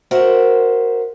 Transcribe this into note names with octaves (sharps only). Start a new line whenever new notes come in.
F#4 A#4 C5 E5 F#5